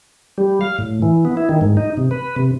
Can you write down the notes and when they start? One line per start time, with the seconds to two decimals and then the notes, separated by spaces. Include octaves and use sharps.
0.38 G3
0.61 F5
0.78 A2
1.02 E3
1.25 B3
1.37 E4
1.49 D#3
1.61 G#2
1.77 D#4
1.97 C3
2.11 B4
2.36 C3